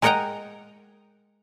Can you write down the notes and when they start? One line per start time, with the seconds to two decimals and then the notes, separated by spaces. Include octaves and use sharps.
0.02 G#3 A#4 D#5 F#5 G5 A#5